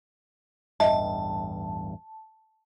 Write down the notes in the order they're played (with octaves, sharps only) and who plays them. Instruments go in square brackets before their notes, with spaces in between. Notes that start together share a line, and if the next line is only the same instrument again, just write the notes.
[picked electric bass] A1 E2 G2 [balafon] D#5 E5 [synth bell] A5